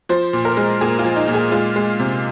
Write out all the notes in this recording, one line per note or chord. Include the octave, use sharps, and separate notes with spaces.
F3 C5
A#2
A#4
G#3
A#2 G#4
F4
F3
D#4
A#2
G#4
G#3 F4
G#3
C3